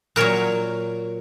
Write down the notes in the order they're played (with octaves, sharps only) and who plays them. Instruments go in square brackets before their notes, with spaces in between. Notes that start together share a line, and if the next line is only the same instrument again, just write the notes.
[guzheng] A#2 F#3 A#4 C#5